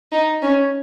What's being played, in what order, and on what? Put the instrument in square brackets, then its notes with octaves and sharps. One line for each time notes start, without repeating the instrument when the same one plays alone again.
[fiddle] D#4
C#4